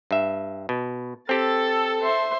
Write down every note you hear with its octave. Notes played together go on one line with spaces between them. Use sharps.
G2 E5
B2
C4 G4 A4 A6
C5 E5 C6